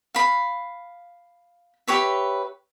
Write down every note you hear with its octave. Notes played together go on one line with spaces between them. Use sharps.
F5 B5
G4 B4 C#5 E5